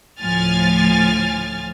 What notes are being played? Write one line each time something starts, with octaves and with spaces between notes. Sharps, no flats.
D2 A2 F3 G#5 F6 A6